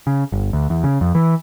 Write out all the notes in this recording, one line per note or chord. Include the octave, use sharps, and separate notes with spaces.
C#3
G1
D2
E2
C#3
F2
E3